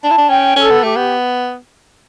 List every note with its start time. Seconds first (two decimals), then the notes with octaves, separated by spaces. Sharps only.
0.02 D4 A5
0.11 E4
0.18 D4
0.30 C#4 G5
0.56 C#4 A4
0.70 B3
0.83 A3 G4
0.96 B3